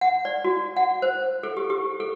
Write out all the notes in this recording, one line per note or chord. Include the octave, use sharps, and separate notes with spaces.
F#5
D5
F#4
F#5
C5
A4
G4
G4
A4